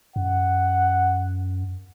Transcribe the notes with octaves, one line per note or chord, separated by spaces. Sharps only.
F#2 F#5